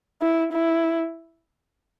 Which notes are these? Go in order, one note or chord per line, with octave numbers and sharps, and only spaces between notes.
E4
E4